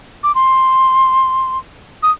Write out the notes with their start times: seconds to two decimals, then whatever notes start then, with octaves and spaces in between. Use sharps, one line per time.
0.23 D6
0.35 C6
2.03 D#6